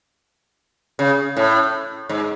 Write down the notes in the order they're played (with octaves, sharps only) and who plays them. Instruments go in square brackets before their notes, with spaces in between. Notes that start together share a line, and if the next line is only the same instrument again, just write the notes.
[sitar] C#3
A2
G#2